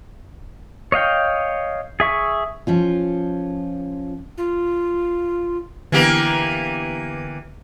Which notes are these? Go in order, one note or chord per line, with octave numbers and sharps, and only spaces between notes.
C#5 D#5 F5 G5
G#4 E5 C#6
F3 C#4 F4
F4
D3 E3 A#3 B3 G4